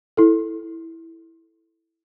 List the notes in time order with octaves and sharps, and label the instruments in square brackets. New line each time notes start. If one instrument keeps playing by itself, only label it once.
[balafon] E4 A4